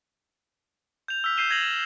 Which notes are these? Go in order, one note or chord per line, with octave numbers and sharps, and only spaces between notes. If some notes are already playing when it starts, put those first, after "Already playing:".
G6 F7
E6 F6 B6
G6 B6 C7 D#7 E7 G7
G#6 A#6 D#7 F7 F#7
E7